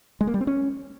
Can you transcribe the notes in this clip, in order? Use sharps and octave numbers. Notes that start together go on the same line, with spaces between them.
G#3
A#3
G3
C4
C#4